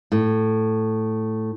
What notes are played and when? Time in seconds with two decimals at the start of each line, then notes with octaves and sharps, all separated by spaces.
0.12 A2